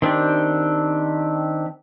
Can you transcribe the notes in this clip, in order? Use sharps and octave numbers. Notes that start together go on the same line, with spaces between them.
D#3 C4 D4 G4